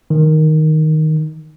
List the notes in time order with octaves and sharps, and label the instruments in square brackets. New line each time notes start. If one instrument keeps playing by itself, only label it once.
[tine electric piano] D#3